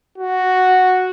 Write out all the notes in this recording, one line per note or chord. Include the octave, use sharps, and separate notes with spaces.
F#4